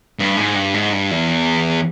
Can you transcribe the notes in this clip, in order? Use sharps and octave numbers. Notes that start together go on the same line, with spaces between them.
G2
G#2
G2
G#2
G2
E2